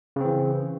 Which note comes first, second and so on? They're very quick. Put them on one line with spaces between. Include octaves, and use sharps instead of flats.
C#3 C4 E3